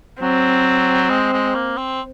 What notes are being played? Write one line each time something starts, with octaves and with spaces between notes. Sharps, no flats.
F#3 C4
G#3
G#3
A#3
C4